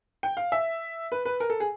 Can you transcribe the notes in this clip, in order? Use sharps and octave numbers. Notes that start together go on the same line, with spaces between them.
G5
F5
E5
B4
B4
A#4
A4
G#4